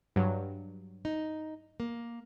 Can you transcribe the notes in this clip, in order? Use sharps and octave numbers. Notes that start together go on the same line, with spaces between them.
G2 F#3
D#4
A#3